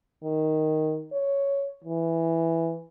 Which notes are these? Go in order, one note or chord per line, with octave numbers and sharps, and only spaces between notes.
D#3
C#5
E3